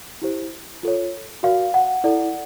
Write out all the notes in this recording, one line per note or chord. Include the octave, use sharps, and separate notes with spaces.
E4 G4 C5
F4 A4 C#5
F#4 A#4 D5 F5
F#5
E4 A4 D5